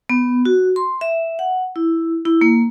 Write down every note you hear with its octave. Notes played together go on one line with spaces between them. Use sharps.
B3
F#4
C6
E5
F#5
E4
E4
A#3